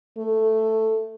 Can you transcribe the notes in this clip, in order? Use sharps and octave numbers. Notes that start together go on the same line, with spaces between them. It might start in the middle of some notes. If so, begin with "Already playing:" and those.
A3